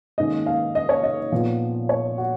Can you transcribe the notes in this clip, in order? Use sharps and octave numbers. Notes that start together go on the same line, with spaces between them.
G#2 D#3 A#3 C#4 D#5
F5
D#5
C#5
D#5
A#2 F3 B3
C#5
F#4